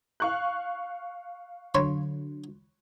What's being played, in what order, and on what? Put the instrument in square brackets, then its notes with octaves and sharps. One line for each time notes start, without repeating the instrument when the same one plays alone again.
[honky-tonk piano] F5 C#6 F#6
[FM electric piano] D3 F#3 [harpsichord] C#5 B5 C6